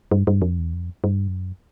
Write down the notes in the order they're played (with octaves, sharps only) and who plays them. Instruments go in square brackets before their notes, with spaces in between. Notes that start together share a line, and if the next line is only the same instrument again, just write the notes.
[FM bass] G2
G2
F2
E2
F2
G2
F#2